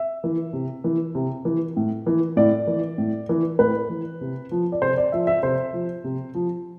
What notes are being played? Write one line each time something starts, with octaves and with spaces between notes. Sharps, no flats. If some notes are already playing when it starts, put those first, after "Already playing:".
Already playing: E5
E3
C3
E3
C3
E3
A2
E3
A2 D5
E3
A2
E3
A2 B4
E3
C3
F3
D5
C3 C5
D5
F3 E5
E5
C3 C5
F3
C3
F3